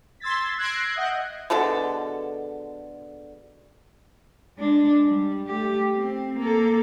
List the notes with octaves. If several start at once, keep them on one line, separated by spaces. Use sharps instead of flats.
C6 E6 G#6 A6 B6
E6 F#6 G#6 A#6 C7 D7
D#5 E5 F#5 F#6 G6
B2 D3 G#3 A4
G#3 D4
G3
A3 G4
C4
A#3 A4